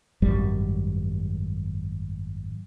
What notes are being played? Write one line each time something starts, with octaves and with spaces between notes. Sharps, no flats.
G#1 F#2 G3